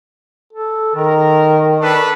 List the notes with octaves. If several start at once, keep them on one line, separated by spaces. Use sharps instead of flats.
A4
D#3 A#4
D4 A4 B4